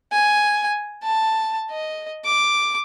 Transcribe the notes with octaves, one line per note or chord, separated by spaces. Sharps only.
G#5
A5
D#5
D6